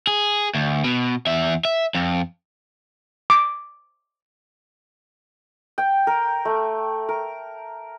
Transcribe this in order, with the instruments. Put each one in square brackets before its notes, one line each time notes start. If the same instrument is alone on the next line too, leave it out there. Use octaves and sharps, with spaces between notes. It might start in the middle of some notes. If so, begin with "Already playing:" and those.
[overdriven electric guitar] G#4
D2
B2
E2 E5
E5
F2
[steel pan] D6
[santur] G5
A#4
A3
A#4